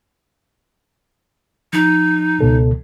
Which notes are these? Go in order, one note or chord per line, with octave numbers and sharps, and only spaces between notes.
F3 D#4
C#2 B2 A4